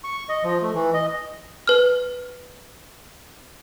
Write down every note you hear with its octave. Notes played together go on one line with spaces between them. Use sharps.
C#6
D#5
F3
A3
E3
D#5
B4 F6